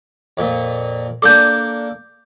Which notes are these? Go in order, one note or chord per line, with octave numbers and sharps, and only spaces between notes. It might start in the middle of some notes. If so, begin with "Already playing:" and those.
F2 A#2
A#3 D4 A4 D6 G6